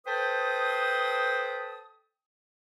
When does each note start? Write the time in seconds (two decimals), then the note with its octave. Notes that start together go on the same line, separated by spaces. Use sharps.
0.06 A4 B4 C5 G5 A5 D#6